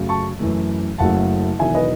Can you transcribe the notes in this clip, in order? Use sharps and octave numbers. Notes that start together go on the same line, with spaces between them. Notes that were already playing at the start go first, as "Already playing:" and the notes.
Already playing: F#2 C#3 F#3 A3
A5 C#6
F#2 E3 A3
F#1 F#2 C#3 F#3 A3 F#5 A5
E1 E2 D#3 F#3 E5 G#5
B4 D#5